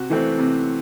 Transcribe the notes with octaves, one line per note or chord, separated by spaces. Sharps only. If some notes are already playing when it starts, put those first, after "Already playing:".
Already playing: C3 F#4
E3 A3 C4
C3